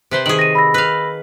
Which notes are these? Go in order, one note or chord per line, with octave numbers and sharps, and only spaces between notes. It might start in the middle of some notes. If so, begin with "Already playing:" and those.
C3 B4 C5
D#3 G#4 F#7
A#6 D#7
B5 E6 A#6
B4 F5